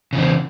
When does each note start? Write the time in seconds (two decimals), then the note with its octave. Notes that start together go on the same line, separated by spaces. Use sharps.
0.13 C#3
0.15 E3
0.18 C4